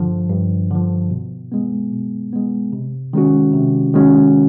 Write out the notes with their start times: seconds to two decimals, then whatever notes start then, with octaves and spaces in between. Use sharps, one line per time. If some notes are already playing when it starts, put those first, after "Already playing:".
Already playing: G2 D3 F3
0.30 G2
0.71 D3 F3
1.11 B2
1.52 G#3 B3
1.92 B2
2.33 G#3 B3
2.73 C3
3.13 D#3 G#3 C#4 F#4
3.54 C3
3.94 D#3 G#3 C#4 F#4